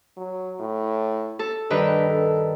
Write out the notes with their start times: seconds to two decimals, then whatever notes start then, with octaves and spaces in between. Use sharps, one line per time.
0.17 F#3
0.60 A2
1.39 A4
1.70 G2 D#3 D4 B4
2.10 A4